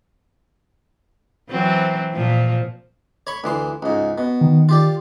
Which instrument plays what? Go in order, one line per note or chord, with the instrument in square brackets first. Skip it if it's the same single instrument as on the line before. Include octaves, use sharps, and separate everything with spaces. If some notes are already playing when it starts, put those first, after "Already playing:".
[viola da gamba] E3 F#3 C4
A#2 F3
[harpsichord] C#5 B5 C#6
D2 E3 C6
C#2 G#2
B2
[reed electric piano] D#3
[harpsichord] F4 G4 D5